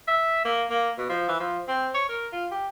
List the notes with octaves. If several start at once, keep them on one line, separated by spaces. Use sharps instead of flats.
E5
A#3
A#3
B2
F3
E3
F3
C4
C#5
A#4
F4
G4